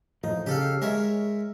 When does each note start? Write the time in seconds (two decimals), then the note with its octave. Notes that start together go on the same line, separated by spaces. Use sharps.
0.24 A2 F3 D#4
0.46 C#3 G4 A4 F5
0.82 G#3 A#4 C#5 E5